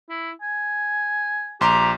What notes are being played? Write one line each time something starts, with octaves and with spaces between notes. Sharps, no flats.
E4
G#5
A#1 G4 A#5 C6 D6